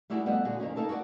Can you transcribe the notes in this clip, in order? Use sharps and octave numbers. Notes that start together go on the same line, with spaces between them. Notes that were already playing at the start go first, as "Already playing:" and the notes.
G3 A3 D4 E4 F#4 G#4
F2 G3 B3 A4 D#5 F#5
A#2 D3 F#4 G#4
F2 D#3 A#3 C#4
A#3 D#4 A4 A#4 A5
F#4 G#4 A#4 D5 F#5